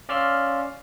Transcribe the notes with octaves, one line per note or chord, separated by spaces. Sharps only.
C#4 D5 F5 C6 E6 F6